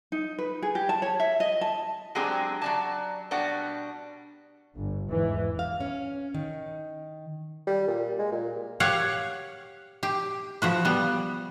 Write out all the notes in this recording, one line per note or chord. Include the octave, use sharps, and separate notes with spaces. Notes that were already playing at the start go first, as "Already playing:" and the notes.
D#4
B4
G#4
G4
A5
C#5
E5
D#5
A5
F#3 G#3 C4 D4 G4 G#4
F#3 D5 A5
B2 G3 D4 D5 F#5
G1
E2 G#2 E3
F5
C#4
D#3
G3
A#2
G#3
A#2
G4 C#5 F5 F#5
G4
F3 F#4 B4
G3 B3